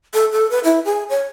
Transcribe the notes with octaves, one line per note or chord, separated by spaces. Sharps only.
A4
A4
B4
E4
G#4
C#5